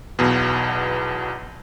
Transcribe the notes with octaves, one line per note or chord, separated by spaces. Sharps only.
B1 E2 B2